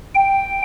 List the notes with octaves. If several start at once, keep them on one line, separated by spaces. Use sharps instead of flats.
G5